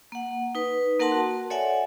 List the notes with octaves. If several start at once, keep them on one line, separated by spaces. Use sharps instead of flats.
A#3 F#5
D#4 B4
A#3 A#4 F#5 A5 C6
F#4
A4 C#5 D5 E5 F#5 G#5